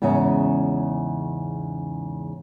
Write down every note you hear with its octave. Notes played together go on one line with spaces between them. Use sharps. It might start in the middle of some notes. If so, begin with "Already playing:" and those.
E2 G#2 C#3 C#4 E5